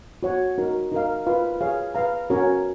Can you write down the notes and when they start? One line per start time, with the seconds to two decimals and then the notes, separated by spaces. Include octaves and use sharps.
0.23 F#4 C#5 F#5
0.58 D#4 F#4 A#4
0.92 D#4 A#4 F5
1.26 F4 B4 F5
1.61 G#4 C#5 F5
1.95 B4 F5 A#5
2.30 C#4 F#4 A#4 C#5